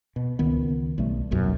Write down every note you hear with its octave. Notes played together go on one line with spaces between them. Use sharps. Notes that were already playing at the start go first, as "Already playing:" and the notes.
B2
C#2 D#3 B3
B1 G3 A3
D#1 B1 F#2